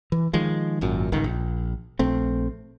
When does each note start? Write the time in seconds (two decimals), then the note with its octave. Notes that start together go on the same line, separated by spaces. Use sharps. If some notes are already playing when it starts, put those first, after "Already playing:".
0.12 E3
0.33 D#3 F3 G#3
0.81 G#1 F#2 A#2
1.12 G1 C#2 G#2 D#3
1.24 A#1
1.99 A#1 A3 C4